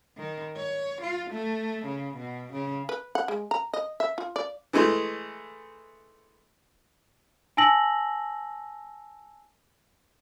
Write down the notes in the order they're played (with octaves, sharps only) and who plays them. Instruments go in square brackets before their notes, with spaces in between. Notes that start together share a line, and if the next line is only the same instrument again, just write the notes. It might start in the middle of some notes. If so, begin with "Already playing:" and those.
[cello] D#3
C#5
F4
A3
C#3
B2
C#3
[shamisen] B4
F#5
G#3
A#5
D#5
E5
F4
D5
[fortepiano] E3 G#3 A3
[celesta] G#5 A5 E6 A#6 F#7